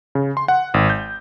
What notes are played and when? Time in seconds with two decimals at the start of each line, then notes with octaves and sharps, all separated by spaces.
0.15 C#3
0.37 C6
0.48 F#5
0.74 G#1
0.90 G6